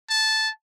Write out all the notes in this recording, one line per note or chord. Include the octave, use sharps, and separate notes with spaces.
A5